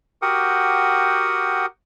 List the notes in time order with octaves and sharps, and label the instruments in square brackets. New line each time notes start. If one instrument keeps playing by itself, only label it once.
[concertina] F#4 G4 A#4 F#5 G5 D#6